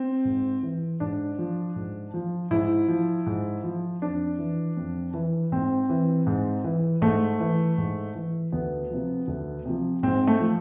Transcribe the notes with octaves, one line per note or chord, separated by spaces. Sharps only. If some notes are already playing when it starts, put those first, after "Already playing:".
Already playing: C4
G#2
E3
G#2 D4
F3
G#2
F3
G#2 E4
F3
G#2
F3
F2 D4
E3
F2
E3
G#2 C4
E3
G#2
E3
G#2 A3
E3
G#2
E3
D2 B3
C3 F3
D2
C3 F3
G#2 C4
A3
F3